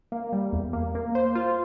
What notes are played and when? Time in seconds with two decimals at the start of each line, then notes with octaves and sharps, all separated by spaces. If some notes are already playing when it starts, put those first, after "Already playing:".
0.12 A#3
0.33 G3
0.53 E2
0.73 A#3
0.95 A#3
1.15 C5
1.35 F4